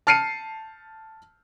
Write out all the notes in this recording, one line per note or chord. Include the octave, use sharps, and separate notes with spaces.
A5 F6 C7 C#7 D#7